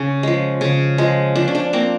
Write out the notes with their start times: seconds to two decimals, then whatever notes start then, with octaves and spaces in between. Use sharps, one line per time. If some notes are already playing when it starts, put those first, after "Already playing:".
Already playing: C#3 C#4
0.23 F3 G#3
0.61 C#3
0.98 F3 G#3
1.35 F3 D4
1.48 C#4
1.55 D4
1.73 A#3 C4